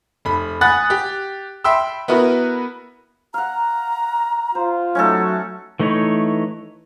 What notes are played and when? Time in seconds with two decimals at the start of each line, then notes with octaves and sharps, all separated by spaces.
0.25 F1 B5
0.61 F#5 G#5 B5 D#6 F#6 A6
0.90 G4
1.64 E5 G5 B5 C6 E6
2.08 B3 E4 F#4 A#4 B4
3.34 F5 F#5 A#5
4.55 F4 C5
4.95 F#3 A3 C#4 D#4 F#4 A4
5.80 E3 A3 D#4 B4 C#5